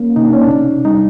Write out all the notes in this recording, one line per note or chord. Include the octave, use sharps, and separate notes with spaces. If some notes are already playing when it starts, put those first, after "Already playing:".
Already playing: A#3 C#4
C3 D#4
D4
C#4
D4
C3
G3 D#4
D4